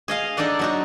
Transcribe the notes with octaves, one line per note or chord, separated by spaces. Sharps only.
G#4 D#5 F5
D4 D#4 A4 D5 F#5
F#3 D#4 F#4